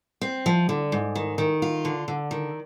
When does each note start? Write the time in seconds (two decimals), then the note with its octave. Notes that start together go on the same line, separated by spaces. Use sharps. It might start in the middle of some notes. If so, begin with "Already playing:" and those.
0.21 C4
0.46 F3
0.69 D3
0.92 G#2
1.15 D#3
1.38 D#3
1.62 F4
1.85 D3
2.08 D3
2.31 D#3